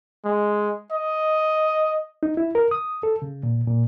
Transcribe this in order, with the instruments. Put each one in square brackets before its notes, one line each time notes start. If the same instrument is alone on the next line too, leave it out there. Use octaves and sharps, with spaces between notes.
[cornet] G#3
D#5
[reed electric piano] D#4
E4
A#4
D#6
A4
C#3
A#2
A#2